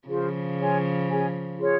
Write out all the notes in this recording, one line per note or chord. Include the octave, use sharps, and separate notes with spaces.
C#3 F3 F4 G#4 C5
F4 G#4 C#5 G#5
C#4 G#4 C#5 G#5
F4 G#4 C#5